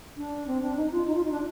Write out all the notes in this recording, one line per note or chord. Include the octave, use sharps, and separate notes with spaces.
D4
C4
D4
D#4
F4
D#4
F4
D#4
D4